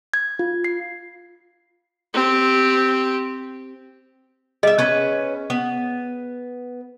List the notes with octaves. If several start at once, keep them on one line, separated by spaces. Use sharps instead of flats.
G#6
F4
C7
C4 G4
G3 G#4 D#5 E5
C#4 B4
B3